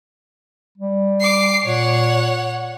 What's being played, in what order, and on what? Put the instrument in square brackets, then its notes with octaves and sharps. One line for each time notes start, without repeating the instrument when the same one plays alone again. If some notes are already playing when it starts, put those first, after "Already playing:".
[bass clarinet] G3
[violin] D6 C7
[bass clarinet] A#2 [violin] C#5 F#5